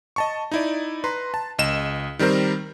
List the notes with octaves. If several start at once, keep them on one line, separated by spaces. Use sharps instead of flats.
D#5 A5 C#6
D#4 E4 D5
B4 A#5 C6
A5
C#2 D#5 E7
D#3 G3 C4 A#4 C5